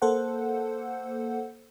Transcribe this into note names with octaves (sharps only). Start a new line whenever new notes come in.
A#3 A4 C5 F#5